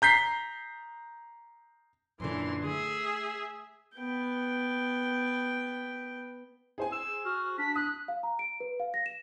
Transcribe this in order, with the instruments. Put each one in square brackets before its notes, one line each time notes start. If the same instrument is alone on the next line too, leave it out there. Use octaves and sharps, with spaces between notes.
[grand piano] A#5 G6 B6 C7
[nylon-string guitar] F#2 A#2 D3 [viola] E3 C6
[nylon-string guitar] A3 [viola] G#4 E5
[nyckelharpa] B3 G5
[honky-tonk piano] G#4 C5 G#5
[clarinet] E6
[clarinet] F#4 [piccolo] F6
[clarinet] D4 [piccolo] B6
[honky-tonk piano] D#6 [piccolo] F#6
[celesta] F5
A#5
D7
B4
F5
A#6
E7